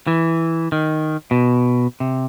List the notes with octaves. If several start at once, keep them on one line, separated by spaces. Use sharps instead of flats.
E3
D#3
B2
C3